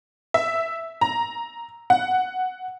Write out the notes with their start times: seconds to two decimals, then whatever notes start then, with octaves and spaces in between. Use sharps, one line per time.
0.34 E5
1.01 A#5
1.90 F#5